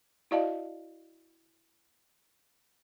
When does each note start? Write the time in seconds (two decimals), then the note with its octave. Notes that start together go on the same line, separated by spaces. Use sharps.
0.31 E4 F#4 D5 D#5 F5 A5